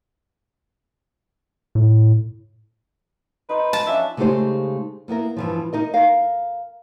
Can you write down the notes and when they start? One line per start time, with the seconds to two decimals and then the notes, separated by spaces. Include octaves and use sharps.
1.75 A2
3.49 D#4 B4 C5
3.73 A5
3.87 F3 C#4 D4 E5
4.17 C#3 G#3 A3 D#4 G4 C5
5.08 A#3 B3 E4 A#4
5.37 G2 E3 F3
5.73 D#4 A#4 D#5
5.94 A#4 F5